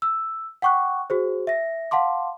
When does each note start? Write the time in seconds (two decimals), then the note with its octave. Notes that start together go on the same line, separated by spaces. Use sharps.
0.02 E6
0.62 F#5 G5 C#6 D6 F#6
1.10 F#4 G#4 C5
1.47 E5 A#6
1.91 F5 F#5 A5 C6 D6